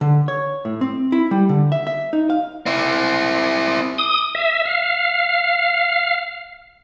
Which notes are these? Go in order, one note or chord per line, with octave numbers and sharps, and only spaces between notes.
D3
C#5
A2
C4
E4
G3
D3
E5
E5
D#4
F5
C4 E4
D#6
E5
F5